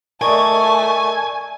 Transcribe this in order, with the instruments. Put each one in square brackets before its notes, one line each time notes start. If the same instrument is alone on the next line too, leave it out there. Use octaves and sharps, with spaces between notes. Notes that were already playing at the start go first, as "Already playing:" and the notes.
[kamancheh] A3 A5 [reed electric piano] A#4 D5 D#5 [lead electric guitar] G#5 [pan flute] C#6